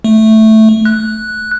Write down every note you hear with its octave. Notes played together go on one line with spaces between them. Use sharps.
A3
F#6